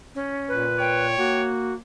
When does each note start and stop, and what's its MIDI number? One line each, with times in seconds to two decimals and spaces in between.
0.15 0.65 61
0.48 1.16 46
0.48 1.06 71
0.80 1.51 73
0.80 1.41 79
1.18 1.78 58
1.18 1.73 66